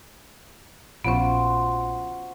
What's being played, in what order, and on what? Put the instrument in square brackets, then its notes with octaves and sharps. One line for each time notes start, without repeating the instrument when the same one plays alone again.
[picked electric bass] A#1 [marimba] B3 C#4 [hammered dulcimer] F4 F#4 C5